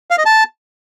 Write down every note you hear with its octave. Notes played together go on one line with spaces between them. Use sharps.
F5
D#5
A5